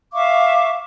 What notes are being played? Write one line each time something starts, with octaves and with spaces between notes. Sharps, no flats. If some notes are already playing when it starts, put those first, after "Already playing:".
E5 F5 C#6 D6